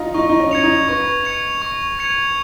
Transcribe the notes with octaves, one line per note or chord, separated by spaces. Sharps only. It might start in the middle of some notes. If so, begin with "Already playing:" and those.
Already playing: D#4 F4
D#4 C#6
D#4
C#4
G#6 C#7 F7
D#4
B4 C#6
G#6 C#7 F7
C#6
G#6 C#7 F7